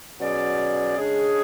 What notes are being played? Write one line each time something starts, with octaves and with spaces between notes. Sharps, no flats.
B2 F#3 C#4 G#4 D5
C#3 G#3 D4 G#4